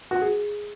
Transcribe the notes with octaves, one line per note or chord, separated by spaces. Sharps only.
F#4
G#4